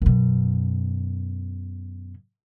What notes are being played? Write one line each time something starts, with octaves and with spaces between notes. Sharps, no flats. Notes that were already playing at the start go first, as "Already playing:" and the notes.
F#2 B2